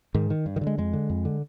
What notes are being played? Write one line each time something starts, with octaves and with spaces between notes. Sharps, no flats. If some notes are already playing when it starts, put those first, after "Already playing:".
G#2 D#3
D#3
G2
D#3
D3
G#3
F2 G#3
D3
F2
D3